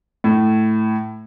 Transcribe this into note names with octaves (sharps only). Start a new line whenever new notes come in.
A2